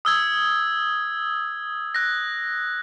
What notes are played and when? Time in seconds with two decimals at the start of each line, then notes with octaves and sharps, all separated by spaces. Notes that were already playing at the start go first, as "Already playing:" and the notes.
0.05 D#6 E6 G#6
1.95 F#6 A#6